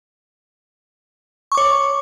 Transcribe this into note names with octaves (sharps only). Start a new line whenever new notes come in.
C#5 C#6 D6